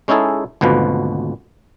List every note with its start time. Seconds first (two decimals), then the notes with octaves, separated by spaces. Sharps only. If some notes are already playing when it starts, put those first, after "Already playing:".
0.08 G#3 C#4 D#4 E4 G#4 A4
0.61 G#1 D2 B2 F3 B4